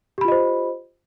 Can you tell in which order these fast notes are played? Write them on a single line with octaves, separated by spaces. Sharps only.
G4 B5 F4 D#5 C5